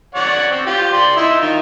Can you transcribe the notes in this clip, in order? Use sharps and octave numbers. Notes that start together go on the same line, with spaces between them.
C#5 D5 F#5
C4
F4 G4
D5 C6
D#4 E4 E6
D#3 F4